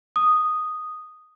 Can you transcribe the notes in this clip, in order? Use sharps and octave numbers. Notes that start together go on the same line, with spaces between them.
D#6